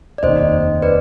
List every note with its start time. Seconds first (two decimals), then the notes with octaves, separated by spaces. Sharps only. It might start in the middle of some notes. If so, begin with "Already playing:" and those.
0.18 D5
0.23 F1 D#2 D#3 C5 D#5
0.82 B4 D5